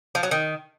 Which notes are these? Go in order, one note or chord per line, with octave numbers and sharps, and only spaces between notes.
F3
F#3
D#3